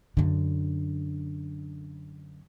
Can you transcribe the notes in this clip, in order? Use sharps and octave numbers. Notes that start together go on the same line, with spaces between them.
F#2 D3